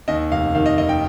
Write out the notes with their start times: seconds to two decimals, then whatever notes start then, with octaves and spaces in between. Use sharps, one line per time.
0.08 D#2 D#5
0.31 F1 F5
0.55 D#3 F5
0.66 D#5
0.78 F1 D#5
0.89 G5